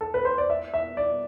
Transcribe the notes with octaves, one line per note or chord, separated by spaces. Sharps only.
A4
B4
C5
D5
E5
E5
D5